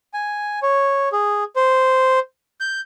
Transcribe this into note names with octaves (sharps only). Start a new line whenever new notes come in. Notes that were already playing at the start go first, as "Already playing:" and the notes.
G#5
C#5
G#4
C5
G6